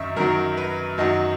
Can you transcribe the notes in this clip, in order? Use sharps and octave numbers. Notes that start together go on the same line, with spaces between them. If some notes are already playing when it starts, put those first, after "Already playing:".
Already playing: F#2 D#3 D#5 E5 C#6
F#2 D#3 F#3 A#4
B4
F#2 D#3 F#3 D#5